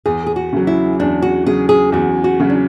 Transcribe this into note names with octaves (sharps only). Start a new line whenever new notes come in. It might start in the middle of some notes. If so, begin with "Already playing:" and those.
E2 G#4
G#4
F#4
C#3 F#3
E4
E2 D4
F#4
C#3 F#3 G#4
G#4
E2 F#4
F#4
C#3 F#3
D4